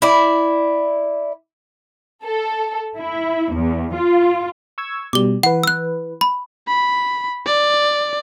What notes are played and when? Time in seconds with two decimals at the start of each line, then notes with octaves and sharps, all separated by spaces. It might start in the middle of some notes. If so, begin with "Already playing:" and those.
0.02 E4 D5
2.25 A4
2.98 E4
3.53 E2
3.94 F4
4.78 C#6 E6 G#6
5.13 B2 G3 D6 G7
5.43 E3 B4 F#5
5.63 E6 F#6
6.21 B5
6.68 B5
7.46 D5